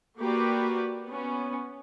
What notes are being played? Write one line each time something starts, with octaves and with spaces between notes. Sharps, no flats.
A#3 F#4 G4 B4 D5
B3 C#4